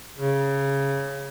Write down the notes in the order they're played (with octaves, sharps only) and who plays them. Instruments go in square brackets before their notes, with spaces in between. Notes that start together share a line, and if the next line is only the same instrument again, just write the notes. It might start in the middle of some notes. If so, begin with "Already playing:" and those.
[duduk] C#3